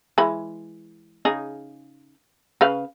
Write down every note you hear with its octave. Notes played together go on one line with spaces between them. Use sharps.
E3 G#3 B5
C#3 D#4 G#4
C#3 B4 F5